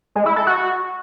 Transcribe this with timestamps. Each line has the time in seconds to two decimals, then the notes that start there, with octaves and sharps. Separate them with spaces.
0.15 G#3
0.26 E4
0.36 A4
0.47 F#4